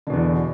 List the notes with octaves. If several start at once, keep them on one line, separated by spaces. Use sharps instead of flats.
E2 B2 D3